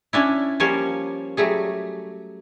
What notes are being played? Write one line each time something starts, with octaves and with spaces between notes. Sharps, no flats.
C#4 D4 E4
F3 G3 A#3 C#4 C#5
F#3 G3 A3 G#4